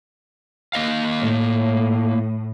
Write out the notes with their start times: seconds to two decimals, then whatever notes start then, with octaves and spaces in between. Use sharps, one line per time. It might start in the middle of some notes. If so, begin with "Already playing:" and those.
0.73 A#3 D#5 F5
1.19 A2